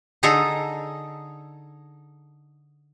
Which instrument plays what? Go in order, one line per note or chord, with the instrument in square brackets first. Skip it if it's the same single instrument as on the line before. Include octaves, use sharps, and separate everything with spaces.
[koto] D3 D#4 G#4 A4 A#5